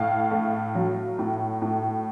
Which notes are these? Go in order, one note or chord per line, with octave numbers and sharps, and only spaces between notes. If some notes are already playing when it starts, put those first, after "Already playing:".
Already playing: A2 F5
A3
F#3
A2
A2